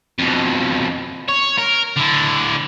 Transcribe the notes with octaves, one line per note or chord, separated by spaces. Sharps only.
F2 B2
C#5
A#4
D3 E4